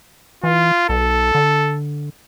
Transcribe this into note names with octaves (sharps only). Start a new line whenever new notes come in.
E3 F4
B1 A4
D3